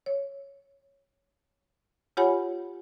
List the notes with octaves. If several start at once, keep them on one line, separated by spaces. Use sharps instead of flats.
C#5
F4 G4 C#5 F#5 G#5 B5